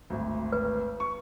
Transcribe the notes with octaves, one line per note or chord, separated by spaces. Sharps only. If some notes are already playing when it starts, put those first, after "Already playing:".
G#1 D2
B4
C#6